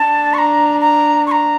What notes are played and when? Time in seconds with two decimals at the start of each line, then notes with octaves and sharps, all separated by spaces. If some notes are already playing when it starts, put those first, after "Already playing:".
Already playing: D4 A5
0.34 C#6
0.38 A#5
0.81 A#5
1.27 C#6
1.32 A#5